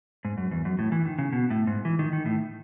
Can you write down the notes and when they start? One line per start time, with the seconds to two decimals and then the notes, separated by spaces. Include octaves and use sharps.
0.25 G#2
0.38 F#2
0.51 E2
0.65 F#2
0.79 A2
0.92 E3
1.05 D#3
1.19 C#3
1.33 B2
1.50 A2
1.67 G#2
1.85 E3
1.99 D#3
2.13 D#3
2.26 A2